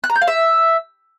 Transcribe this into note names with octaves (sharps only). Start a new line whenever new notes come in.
F#6
A#5
G6
F5
E5